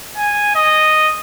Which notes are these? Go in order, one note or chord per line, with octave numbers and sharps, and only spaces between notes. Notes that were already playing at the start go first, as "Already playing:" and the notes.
G#5
D#5